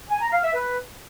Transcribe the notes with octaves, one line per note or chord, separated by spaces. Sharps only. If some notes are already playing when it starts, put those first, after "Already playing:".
G#5
A#5
F5
E5
B4